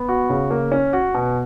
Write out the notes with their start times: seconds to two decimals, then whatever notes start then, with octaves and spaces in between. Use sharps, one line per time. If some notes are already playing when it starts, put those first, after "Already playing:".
Already playing: B3
0.09 F#4
0.30 C#3
0.51 A#3
0.72 C#4
0.93 F#4
1.14 B2